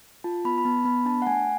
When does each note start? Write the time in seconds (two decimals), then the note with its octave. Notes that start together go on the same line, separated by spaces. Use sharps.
0.24 F4 A5
0.45 B3 B5
0.58 B5
0.64 B3 A5
0.85 B3 B5
1.05 D4 A5
1.22 F#5
1.27 A3 G#5